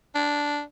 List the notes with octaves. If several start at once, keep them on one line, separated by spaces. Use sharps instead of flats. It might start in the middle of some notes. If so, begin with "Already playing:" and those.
D4